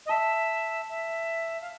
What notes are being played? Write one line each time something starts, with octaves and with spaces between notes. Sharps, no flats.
D#5
E5 A5
E5
F5